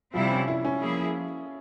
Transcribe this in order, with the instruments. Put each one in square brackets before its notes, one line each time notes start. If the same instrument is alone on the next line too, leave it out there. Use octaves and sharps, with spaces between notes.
[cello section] C3 G3 C4 E4 [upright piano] F3
[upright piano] C#4
E4
C#4
[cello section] F3 A#3 E4 G#4